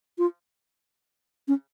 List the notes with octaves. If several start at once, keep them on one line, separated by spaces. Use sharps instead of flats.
F4
C#4